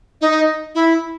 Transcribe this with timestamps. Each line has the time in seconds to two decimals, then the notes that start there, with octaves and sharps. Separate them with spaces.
0.21 D#4
0.75 E4